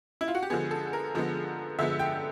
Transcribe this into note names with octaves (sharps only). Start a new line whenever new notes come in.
E4
F4
F#4
G4
D3 F3 G#3 B3 G#4
A4
A#4
D3 F3 G#3 B3
D3 F3 G#3 B3 E5
G5